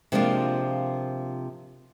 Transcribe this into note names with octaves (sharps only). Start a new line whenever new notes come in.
C3 F3 G#3 A#3 D4 F4